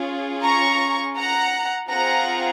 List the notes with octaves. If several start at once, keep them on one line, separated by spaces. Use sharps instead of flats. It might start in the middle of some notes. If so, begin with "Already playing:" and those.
Already playing: C#4 F4 G#4
A#5 C#6
F#5 A#5
C4 F4 G#4 F#5 A#5